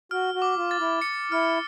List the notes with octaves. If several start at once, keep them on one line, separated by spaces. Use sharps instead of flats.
F#4 F6
F#4
D6
F4
A6
E4
C#7
E4 F6